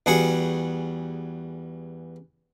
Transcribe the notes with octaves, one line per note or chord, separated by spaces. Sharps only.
E2 G3 F#4 G#4 G#5 C#6